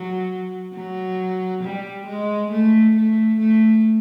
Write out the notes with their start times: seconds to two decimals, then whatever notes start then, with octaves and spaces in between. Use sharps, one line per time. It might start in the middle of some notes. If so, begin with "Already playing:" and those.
Already playing: F#3
0.74 F#3
1.63 G3
2.07 G#3
2.51 A3
2.96 A3
3.40 A3